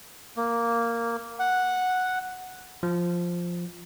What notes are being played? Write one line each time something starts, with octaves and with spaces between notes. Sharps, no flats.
A#3
F#5
F3